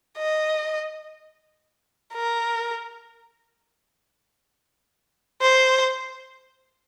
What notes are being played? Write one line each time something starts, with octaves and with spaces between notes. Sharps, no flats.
D#5
A#4
C5